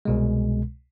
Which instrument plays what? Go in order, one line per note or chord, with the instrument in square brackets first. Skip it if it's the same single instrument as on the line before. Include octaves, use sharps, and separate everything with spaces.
[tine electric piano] C2 B2 G#3